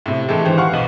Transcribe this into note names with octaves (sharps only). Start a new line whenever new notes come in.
A2 C3
A2 E3 G#3 G4 A4
D#3 E3 G4 C5
F5 F#5 C#6
B1 B3 F#7